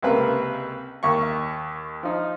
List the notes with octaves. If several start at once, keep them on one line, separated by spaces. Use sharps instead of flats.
C#2 C3 A#3 B4
D#2 A#3 C#6
F3 D#4